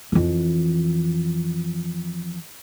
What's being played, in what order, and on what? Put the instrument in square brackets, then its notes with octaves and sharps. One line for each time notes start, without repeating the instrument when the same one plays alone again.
[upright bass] F2 E3